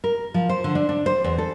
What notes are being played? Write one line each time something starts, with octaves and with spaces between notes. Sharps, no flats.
A#4
F3
C5
D3
D4
D4
C5
E2
A4